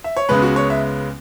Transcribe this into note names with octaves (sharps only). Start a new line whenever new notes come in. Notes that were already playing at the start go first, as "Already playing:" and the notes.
E5
C#5
C#2 C#3 G#3 B3 B4
F#4
C#5
E5